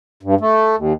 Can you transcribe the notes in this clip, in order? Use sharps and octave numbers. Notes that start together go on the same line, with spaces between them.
G2
A3
D#2